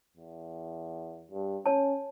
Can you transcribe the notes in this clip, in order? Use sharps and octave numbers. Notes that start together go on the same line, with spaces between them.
E2
G2
C#4 C#5 A5